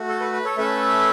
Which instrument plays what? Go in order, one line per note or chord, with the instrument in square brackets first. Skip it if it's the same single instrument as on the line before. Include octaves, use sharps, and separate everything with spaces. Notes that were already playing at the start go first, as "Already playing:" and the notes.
Already playing: [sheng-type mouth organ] A3 F#4
A4
B4
B4
A4 C#5
A3 C#4 A4 B4 E5